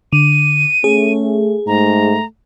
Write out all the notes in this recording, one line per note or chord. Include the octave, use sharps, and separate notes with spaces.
D3 D#7
A3 C#4 G#4
G#2 A3 A#5